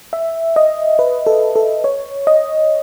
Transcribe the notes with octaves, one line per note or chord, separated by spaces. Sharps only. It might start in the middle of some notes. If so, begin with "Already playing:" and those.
E5
D#5
B4
A4
A4
C#5
D#5